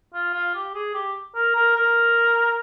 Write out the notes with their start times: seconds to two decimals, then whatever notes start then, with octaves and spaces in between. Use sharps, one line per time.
0.14 F4
0.34 F4
0.55 G4
0.74 G#4
0.94 G4
1.35 A#4
1.56 A#4
1.76 A#4